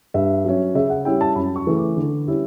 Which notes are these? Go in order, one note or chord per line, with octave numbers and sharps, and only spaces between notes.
G2 E5
F#3 C#4
C#3 E5
F#5
G3 C#4 E4 G5
A5
F#2 B5
C#6
C#3 E3 A3 E4
D6
D3
G3 C#4 E4